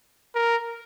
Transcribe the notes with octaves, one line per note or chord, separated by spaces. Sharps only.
A#4